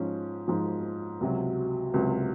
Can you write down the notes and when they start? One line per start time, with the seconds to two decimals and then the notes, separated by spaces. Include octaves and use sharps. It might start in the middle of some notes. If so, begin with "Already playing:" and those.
Already playing: G#2 F3 C#4
0.48 G#2 F3
1.21 C#2 C3 F#3
1.94 C#2 C3 F#3